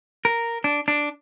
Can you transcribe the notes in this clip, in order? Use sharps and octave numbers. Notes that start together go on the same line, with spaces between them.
A#4
D4
D4